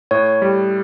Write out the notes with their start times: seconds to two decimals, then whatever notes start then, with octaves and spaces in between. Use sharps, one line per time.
0.11 A2 C#5
0.42 G3